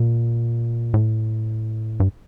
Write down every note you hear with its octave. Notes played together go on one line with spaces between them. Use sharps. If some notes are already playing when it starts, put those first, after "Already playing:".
Already playing: A#2
A2
G2